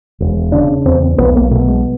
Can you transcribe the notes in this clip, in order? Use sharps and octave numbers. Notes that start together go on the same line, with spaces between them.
E1
C#3 D4
E2 C4
B1 B3
A#3
B2 A3
G#3